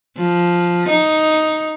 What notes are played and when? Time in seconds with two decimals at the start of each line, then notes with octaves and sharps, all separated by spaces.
0.18 F3
0.89 D#4